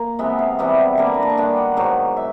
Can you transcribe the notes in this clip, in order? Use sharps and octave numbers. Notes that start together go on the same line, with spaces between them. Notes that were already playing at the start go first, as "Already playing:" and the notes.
Already playing: A#3
C3 E3 G#3 B3 E5
F5
C3 E3 G3 B3 E5
D3 G3 A#3
B5
A#5
A5
G#5
D#3 G3 B3 D4 G5
F#5
G#2 D#3 F#3 F5
E5